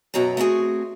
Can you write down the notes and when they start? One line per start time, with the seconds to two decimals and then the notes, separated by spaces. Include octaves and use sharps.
0.14 F#2 B2 F#3 F#4 A#5
0.37 A3 C4 F#4 G#4